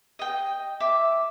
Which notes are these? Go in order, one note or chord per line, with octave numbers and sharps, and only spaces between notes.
D#5 G5
E5 D6